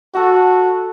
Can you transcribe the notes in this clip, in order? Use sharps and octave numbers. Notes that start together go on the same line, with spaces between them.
F#4 A4 F#5